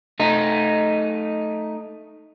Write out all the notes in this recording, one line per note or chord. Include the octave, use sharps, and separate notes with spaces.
A3 D#4